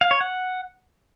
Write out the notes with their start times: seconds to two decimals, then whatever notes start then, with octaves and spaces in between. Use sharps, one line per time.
0.01 F5
0.11 C#5
0.21 F#5